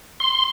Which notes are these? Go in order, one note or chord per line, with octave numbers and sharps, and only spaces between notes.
C6